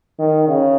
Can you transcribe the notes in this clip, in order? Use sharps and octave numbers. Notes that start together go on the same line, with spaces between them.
D#3
C#3